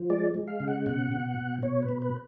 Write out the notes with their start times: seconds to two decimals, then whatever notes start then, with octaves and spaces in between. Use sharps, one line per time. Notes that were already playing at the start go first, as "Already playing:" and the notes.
Already playing: F3
0.10 G#3 D5
0.34 G#3
0.48 F5
0.60 C#3
0.68 F#5
0.86 B2 F#5
1.12 B2
1.38 B2
1.62 B2 C#5
1.82 B4
1.89 B2
2.02 B4